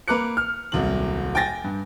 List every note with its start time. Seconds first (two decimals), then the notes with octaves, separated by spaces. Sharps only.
0.08 A#3 B4 A#5 D6 F#6 C#7
0.37 F6
0.72 D#1 C2 F#3 F#7
1.35 G5 G#5 A6 A#6
1.64 G2